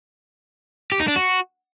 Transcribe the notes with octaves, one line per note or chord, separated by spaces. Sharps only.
G4
D#4
D4
F#4